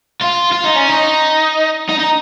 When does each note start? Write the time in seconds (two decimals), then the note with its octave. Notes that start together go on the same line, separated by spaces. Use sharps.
0.22 F4
0.53 F4
0.65 D#4
0.76 C#4
0.89 D#4
1.89 D#4
1.99 D#4